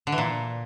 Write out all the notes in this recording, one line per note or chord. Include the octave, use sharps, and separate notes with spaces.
D3
E3
A#2